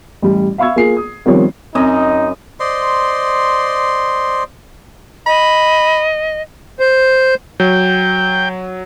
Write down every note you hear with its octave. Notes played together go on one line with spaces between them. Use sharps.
A1 G3
E5 F5 B5 C#6 E6 G#6
A#3 F4 G#4 C7
D#6
D#3 F3 G3 B3 C4 C#5
F#2 C4 D#4 D#5
C5 D5 D#5 C6
D#5 B5
C5
F#3 G5